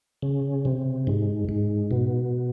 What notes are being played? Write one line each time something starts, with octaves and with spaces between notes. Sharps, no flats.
C#3
C3
G#2
G#2
B2